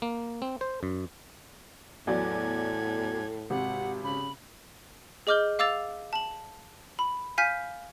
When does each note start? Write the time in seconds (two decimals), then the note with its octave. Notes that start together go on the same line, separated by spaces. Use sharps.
0.02 A#3
0.42 C4
0.61 C5
0.83 F#2
2.07 E2 A2 F#3 D5 G#6
3.50 G#1 C3 F#5
4.04 C#3 B5
5.27 G#4 D#5 D6 F6 G6 G7
5.59 F5 D6 E6 A6 F7
6.13 A5 F#7
6.99 B5
7.38 F5 G#5 F6 G6 B6 D#7